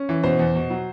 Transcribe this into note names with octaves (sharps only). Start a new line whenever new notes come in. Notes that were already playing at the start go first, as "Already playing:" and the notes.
Already playing: C#4
E3
B2 C5
E2
B2
F#3